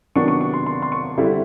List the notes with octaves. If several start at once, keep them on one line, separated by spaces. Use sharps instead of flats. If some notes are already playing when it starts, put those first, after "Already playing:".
C3 D#3 F#3 B3 D4 C#6
C#6
C#6
C6
C6
C6
C#6
D3 G3 C4 E4